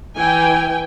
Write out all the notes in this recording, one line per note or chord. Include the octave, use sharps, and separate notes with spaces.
E3 G5 G#5